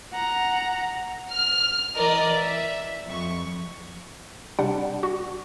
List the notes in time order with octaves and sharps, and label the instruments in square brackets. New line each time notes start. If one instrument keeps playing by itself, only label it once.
[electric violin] F#5 A#5
[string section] F6
E3 A#4 D5 D#5
E5
F2 C#6
[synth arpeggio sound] C3 G3 D4 F#5
F#4